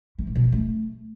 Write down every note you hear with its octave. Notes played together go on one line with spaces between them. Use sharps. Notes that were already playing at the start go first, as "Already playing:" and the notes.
E3
A2
B2
B3
A3